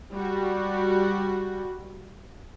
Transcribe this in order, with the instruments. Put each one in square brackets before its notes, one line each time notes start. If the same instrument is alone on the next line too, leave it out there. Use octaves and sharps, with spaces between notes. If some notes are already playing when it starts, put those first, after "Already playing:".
[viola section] G3 F#4